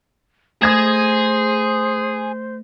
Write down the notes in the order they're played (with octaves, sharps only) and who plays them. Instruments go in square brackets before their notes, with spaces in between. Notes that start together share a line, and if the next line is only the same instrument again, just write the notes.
[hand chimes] A3 A#6 [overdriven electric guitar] G#4 [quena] C5 [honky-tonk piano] D#6 G#6 E7